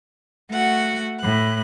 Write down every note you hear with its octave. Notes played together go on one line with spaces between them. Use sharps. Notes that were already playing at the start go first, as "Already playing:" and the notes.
A3 F#4 F#5
A2 F#6